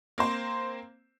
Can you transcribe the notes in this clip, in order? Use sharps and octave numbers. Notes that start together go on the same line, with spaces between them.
A#3 C4 C5